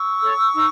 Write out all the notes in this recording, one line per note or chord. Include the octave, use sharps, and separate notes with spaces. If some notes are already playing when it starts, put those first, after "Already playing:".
Already playing: C#6 E6
A4 C#5
D#4